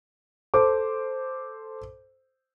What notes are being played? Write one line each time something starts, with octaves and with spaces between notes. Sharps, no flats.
A4 C5 D6